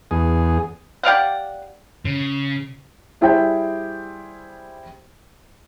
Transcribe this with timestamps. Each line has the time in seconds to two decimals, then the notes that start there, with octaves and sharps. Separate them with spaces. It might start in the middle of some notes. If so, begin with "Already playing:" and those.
0.11 E2 G#4
1.03 G4 D5 F5 F#5
2.05 C#3
3.21 G3 E4 G#4 C5 E5 G5